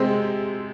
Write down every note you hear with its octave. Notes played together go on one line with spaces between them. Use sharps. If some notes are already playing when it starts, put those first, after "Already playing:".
Already playing: C3 G#3 C4